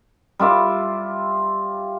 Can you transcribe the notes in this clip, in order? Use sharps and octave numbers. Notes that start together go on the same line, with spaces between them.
G3 F4 E5 D6